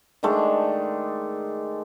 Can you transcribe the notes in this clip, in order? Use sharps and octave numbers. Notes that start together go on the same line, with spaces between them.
D#3 G#3 A3 D4